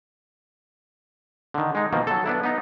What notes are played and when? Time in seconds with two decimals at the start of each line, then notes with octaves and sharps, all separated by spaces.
1.54 D3 D#3
1.75 G#3 D#4
1.93 B2 D#3 F3 A#3
2.07 F#3 A4
2.26 B3 D4 E4
2.43 B3 D#4